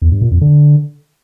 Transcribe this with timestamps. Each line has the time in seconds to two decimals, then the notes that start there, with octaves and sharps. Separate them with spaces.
0.02 E2
0.12 G2
0.21 A#2
0.31 F2
0.41 D3